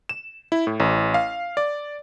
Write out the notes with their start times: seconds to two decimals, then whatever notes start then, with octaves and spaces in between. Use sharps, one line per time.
0.09 E7
0.52 E4
0.67 A2
0.80 A1
1.14 F5
1.57 D5